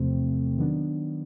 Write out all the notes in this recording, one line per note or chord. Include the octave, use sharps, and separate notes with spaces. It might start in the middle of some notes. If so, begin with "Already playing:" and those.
Already playing: E2 C3 F3 A3 C4
D#3 F#3 B3 D4